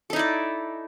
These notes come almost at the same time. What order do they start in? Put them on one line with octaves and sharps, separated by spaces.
A4 D#4 E4 D5